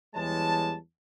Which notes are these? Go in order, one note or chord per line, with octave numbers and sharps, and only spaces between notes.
E2 E3 G3 G#3 C#5 A5